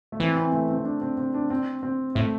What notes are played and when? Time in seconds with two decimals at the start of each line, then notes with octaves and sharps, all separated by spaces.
0.12 A3
0.20 E3 C4
0.36 C4
0.52 A3
0.69 C4
0.85 D4
1.01 C4
1.17 C4
1.34 D4
1.50 C4
1.83 C4
2.15 A2 A3